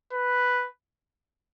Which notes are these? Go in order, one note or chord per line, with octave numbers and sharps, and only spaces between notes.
B4